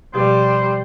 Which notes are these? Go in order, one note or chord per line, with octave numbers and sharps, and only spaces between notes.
B2 F3 G3 G4 C5